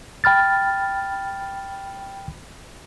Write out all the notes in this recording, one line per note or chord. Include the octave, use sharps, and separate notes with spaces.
G5 B5 F6 A6